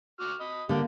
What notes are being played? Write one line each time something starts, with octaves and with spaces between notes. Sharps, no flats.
F#4 D6 F6
D#5 B5
D3 A#3 G4